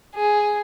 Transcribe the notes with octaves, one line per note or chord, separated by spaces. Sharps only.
G#4